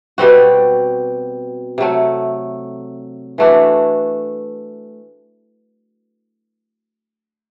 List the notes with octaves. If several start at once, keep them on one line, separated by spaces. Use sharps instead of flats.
B2 G3 C4 F#4
C3 F#3 A3
E3 A3 D4 F#4